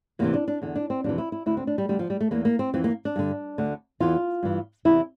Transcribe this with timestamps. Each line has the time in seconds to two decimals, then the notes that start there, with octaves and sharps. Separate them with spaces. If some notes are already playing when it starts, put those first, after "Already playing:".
0.19 E2 C3 E3 A#3
0.34 D4
0.48 D4
0.62 E2 D3
0.76 D4
0.90 C4
1.04 F2 C3 E3 D4
1.18 E4
1.32 E4
1.46 D2 D3 E4
1.57 C4
1.67 D4
1.78 G3
1.88 D2 D3 G3
1.99 F3
2.10 G3
2.21 A3
2.31 E2 E3 A#3
2.45 A#3
2.59 C4
2.74 F2 E3 C4
2.84 A#3
3.05 D4
3.16 G2 D3
3.58 D2 D3
4.00 E2 E3 F4
4.43 G2 E3
4.85 E2 C3 E3 E4